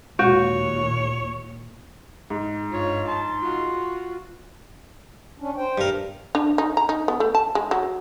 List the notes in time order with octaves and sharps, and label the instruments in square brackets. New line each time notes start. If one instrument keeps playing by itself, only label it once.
[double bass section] D#2 A#2 [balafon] G#3 [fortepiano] F#4 [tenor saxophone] C#5
[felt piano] G#2
[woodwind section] G2 [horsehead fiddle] F4 C#5
[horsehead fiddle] A5 [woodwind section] C6
[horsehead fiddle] F4 F#4
[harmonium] C#4 D4
C5 G5
[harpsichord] G2 A#4
[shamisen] D4
D#4
A#5
D#4
B3
A3
A5
G#3
F#3